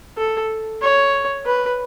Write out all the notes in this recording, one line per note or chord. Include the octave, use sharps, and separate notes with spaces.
A4
C#5
B4